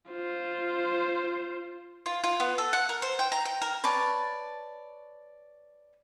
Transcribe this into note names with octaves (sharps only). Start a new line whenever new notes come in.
F4 C5
F4
F4
B3
A4
F#5
A#4
C5
G5
A#5
G5
A#4
B4 C#5 D5 A5